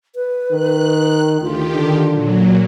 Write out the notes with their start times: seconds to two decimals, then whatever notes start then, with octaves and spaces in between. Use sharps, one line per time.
0.15 B4
0.51 D#3 F#6
1.41 D2 D#3 F4 G4
1.75 D3
2.08 A#2 F#3